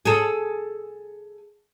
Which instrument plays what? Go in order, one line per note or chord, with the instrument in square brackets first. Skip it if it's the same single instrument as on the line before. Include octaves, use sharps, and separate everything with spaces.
[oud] G#4 A4